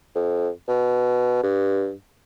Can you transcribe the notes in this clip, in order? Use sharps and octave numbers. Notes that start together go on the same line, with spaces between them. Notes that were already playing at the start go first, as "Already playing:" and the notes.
F2
B2
G2